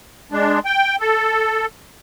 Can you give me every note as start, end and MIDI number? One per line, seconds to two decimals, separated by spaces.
0.32 0.59 56
0.32 0.59 62
0.65 0.96 79
1.00 1.66 69